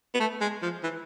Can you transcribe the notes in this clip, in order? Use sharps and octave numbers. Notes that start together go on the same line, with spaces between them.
B3
A3
G#3
F3
E3